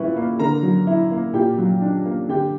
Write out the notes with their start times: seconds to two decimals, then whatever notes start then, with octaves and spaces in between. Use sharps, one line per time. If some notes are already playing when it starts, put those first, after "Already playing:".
Already playing: A#2 G3 E4 B4 C#6
0.16 A#3
0.39 D3 A#4 A#5
0.63 F#3
0.87 E4
1.11 A#3
1.34 A#2 G4 G5
1.58 F#3
1.81 D4
2.05 A#3
2.28 D3 G4 G5